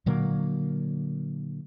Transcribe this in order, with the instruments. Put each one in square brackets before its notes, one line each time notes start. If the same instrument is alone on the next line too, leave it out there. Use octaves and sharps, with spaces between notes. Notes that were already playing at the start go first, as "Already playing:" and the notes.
[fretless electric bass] A#2 D3 F#3 A#3